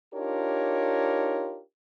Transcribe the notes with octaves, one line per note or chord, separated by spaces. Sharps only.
D4 D#4 F4 G4 A#4 C#5